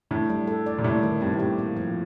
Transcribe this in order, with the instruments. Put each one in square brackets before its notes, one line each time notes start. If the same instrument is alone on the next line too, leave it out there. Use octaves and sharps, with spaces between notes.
[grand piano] A2 [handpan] D4
[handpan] G3
A4
D5
[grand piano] A#2
[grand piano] A2 [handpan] G3
[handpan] D#3
[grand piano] G2 [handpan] C4
[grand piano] A2
[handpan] G4
A#3
F3